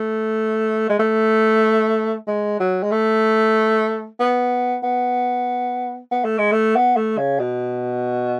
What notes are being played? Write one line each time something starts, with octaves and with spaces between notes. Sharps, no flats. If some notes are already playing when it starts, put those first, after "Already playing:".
Already playing: A3
G#3
A3
G#3
F#3
G#3
A3
B3
B3
B3
A3
G#3
A3
B3
A3
C#3
B2